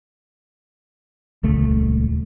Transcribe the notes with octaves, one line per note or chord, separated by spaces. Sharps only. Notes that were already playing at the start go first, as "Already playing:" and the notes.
D#1 C#2 A3